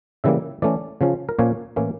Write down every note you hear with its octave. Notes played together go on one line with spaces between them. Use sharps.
C#3 E3 G3 A#3 E5
E3 A3 C#4 D5
C#3 F3 C#4
A#4
A#2 F3 A#3 C#4 C#5
A2 E3 A#3 C#4